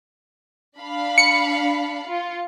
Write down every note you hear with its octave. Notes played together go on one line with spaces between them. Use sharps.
D4 F5 B5
C#7
F4